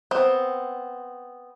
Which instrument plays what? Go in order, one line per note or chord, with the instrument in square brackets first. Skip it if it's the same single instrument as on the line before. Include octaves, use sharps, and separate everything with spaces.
[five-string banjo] B3 C4